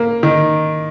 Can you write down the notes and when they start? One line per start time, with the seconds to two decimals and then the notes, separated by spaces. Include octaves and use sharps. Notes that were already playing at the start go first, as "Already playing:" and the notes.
Already playing: A#3
0.23 D#3